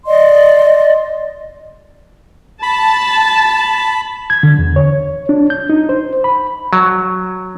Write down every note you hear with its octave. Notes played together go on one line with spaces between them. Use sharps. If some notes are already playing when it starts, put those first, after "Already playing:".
D5 D#5 C6
A5 B5
G#6
D3
E2
C#5
D4
G6
D#4
C5
B5
F#3